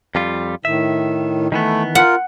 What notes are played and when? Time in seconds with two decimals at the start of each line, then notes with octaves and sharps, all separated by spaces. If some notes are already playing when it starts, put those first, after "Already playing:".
0.15 F2 G3 F4
0.65 A2 D#3 E5
1.52 D#3 E3 A3 B3
1.95 F4 A#4 F#5